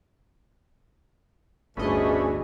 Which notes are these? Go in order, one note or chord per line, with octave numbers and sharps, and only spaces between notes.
G1 D2 A2 C#4 D4 G#4 B4 D#5